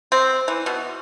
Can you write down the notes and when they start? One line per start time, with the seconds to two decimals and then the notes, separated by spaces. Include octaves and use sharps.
0.12 C4
0.48 E3
0.66 B2